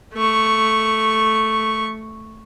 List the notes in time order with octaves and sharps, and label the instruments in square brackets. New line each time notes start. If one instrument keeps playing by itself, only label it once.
[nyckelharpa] A3 C#6